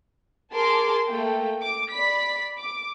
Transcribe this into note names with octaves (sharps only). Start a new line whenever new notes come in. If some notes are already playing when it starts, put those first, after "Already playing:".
G#4 A#4 A5 C6 D6
A3 A#3 G5
D6
D5 B5 B6
D6